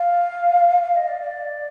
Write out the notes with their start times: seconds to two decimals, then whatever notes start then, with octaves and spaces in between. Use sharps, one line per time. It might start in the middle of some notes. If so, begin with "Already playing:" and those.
Already playing: F5
0.82 F5
0.95 D#5
1.08 D5
1.20 D5